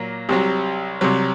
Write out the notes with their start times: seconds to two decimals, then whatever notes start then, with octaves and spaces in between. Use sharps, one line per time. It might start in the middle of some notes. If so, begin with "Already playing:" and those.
Already playing: A#2 F#3 A#3 F4
0.29 C2 C3 F#3
1.01 C2 C3 F#3